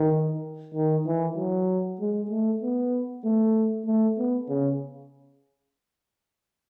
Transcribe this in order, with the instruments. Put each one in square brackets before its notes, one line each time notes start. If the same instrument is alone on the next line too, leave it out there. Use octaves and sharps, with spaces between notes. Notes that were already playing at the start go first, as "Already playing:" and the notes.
Already playing: [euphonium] D#3
D#3
E3
F#3
G#3
A3
B3
A3
A3
B3
C#3